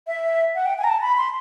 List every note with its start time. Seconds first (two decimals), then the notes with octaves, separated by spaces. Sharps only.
0.07 E5
0.55 F#5
0.66 G5
0.78 G#5
0.84 A#5
0.89 A5
1.02 B5
1.17 C6